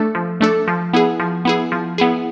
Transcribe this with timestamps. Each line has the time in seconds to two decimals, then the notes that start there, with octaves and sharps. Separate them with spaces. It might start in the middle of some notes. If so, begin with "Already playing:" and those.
Already playing: A3 D4 A4
0.15 F3
0.41 A3 D4 A4
0.68 F3
0.93 B3 E4 G#4
1.20 F3
1.45 B3 E4 G#4
1.72 F3
1.98 B3 E4 G#4